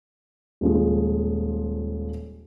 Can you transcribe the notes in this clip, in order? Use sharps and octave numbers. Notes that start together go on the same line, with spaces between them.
D#1 F3 G#3